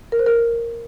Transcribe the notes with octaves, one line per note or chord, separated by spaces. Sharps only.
A#4
C5
A#4